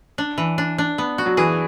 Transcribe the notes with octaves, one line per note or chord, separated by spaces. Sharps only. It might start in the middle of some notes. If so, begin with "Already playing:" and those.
D4
E3
D4
D4
B3
F#4
F#3
E3 G#4